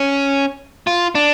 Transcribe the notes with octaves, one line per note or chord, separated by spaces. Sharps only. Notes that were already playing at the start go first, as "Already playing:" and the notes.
Already playing: C#4
F4
D4